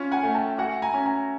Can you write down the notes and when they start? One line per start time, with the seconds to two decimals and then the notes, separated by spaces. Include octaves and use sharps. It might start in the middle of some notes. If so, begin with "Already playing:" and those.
Already playing: C#4 F4
0.11 F#5 G#5
0.23 A3
0.35 G5 A5
0.58 F#4 F#5 G#5
0.82 G#5 A#5
0.94 C#4
1.06 G#5 A#5